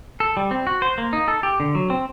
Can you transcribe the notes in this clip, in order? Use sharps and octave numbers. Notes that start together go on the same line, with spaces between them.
A4
G3
C4
F#4
C5
A#3
D#4
A4
G4
D3
F#3
C4